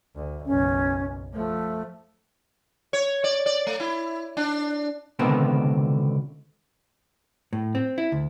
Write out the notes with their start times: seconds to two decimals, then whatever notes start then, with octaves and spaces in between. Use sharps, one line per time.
0.16 D2
0.46 F#1 B1 C#4
1.34 F3 A3
2.93 C#5
3.24 D5
3.46 D5
3.67 A3
3.80 E4
4.37 D4
5.19 C#2 B2 D3 D#3 B3 C4
7.53 A2
7.75 C4
7.98 E4
8.12 D2